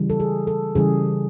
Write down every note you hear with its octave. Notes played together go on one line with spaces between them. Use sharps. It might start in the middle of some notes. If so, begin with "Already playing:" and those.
Already playing: C#3 E3 G3
A4
G#4
A4
C#3 E3 G3 G#4